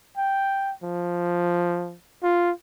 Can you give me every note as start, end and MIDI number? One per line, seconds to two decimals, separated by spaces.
0.17 0.73 79
0.83 1.96 53
2.23 2.51 65